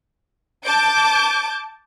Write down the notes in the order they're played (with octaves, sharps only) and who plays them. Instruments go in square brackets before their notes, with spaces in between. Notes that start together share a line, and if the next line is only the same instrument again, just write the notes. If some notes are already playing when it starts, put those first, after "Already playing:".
[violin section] A5 D6 G6 D7